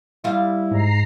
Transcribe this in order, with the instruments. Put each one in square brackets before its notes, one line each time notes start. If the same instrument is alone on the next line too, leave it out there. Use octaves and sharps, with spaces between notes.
[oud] G3 F4 [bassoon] E4
[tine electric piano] G#2 [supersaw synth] A#5 C7